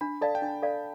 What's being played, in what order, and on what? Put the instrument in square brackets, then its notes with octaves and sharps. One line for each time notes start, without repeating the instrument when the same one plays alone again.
[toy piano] D4 [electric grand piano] B5
[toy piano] A4 D5 F5 [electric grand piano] A5
[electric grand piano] G5
[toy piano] D4
[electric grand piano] A5
[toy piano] A4 D5 F5